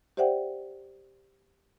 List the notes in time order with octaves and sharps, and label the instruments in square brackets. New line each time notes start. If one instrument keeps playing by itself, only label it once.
[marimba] G4 C5 D5 E5 F#5 G5